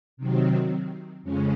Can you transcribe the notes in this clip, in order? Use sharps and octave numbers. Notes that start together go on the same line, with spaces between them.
C3 D#3 F#3 C4
F2 C#3 G#3 C#4